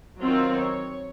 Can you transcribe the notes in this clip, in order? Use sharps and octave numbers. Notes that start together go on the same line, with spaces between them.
D#3 F#3 C4 F4
C#5